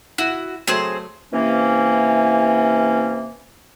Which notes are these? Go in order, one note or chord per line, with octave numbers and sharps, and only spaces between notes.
E4 F#4
F#3 A3 C4 G#4 C5
C3 E3 A#3 C#4